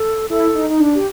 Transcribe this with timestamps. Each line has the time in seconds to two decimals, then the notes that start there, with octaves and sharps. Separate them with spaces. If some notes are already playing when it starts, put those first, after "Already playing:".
Already playing: A4
0.30 E4 A4
0.55 D#4
0.70 D#4
0.80 D4
0.95 G4